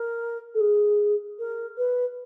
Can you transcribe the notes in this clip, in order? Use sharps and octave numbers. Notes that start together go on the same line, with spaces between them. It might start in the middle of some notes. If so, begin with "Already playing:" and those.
Already playing: A#4
A4
G#4
A#4
B4